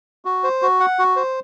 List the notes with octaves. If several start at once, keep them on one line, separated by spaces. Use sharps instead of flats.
F#4
C5
F#4
F#5
F#4
C5